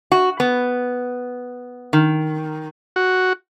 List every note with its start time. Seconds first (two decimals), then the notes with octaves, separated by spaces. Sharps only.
0.12 F#4
0.40 B3
1.93 D#3
2.96 F#4